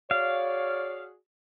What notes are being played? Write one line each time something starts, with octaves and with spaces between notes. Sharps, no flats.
F#4 G#4 C#5 D5 F5